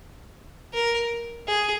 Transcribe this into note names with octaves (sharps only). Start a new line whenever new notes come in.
A#4
G#4